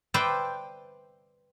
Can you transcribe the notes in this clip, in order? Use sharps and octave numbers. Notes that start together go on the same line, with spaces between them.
B4 C5 D5 E5 G5